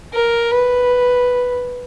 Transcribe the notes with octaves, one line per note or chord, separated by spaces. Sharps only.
A#4
B4